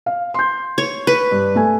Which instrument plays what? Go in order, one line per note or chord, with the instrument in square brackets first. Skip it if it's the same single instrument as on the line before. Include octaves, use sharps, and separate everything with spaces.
[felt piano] F5
C6 G6
[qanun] C#5
B4
[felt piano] G2
A3 G#5